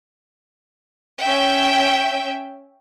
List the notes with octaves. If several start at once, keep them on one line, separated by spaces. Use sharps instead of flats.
C#4 E5 G5